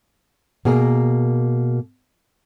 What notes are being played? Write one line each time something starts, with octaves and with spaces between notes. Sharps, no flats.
B2 A#3 G#4 A#4